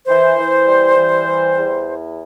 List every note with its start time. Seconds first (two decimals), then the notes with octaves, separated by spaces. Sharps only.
0.07 E3 C5
0.37 E3
0.67 G3
0.97 E3
1.27 G3
1.57 E2